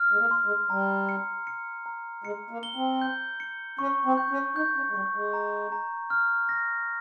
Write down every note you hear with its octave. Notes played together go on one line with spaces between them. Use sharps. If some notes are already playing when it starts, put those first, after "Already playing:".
Already playing: F6
G#3
A#3
C6
G#3
G3 A#5
C#7
C#7
A#5
G#3 C#7
A#3
G7
C4
G6
C#7
C#4 C#6
C4
G6
C#4
D#4 G6
C#4
G#3
G3 C#6
G#3
A#5
A#5
F6
A#6